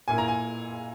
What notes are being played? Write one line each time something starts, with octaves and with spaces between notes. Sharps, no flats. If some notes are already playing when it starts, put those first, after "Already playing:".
A#2 A#3 E4 G#5
A#5
G#5